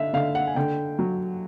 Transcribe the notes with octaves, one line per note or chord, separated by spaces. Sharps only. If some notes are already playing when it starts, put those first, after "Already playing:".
Already playing: D3 E5 F5
D3 F5
F#5
G#5
D3 G5
F#3